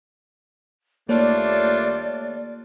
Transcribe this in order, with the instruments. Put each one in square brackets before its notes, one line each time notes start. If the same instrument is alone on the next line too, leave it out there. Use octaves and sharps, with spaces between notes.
[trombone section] D#2 A3 [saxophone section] G3 D4 F4 [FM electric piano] A#3 C#5 [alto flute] D5